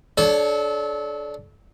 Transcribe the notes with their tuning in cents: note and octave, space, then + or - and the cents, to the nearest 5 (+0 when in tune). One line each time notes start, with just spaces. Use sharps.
D4 +0 A4 -30 C#5 +0